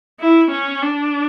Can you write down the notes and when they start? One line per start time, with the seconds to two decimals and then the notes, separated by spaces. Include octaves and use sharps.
0.20 E4
0.51 C#4
0.82 D4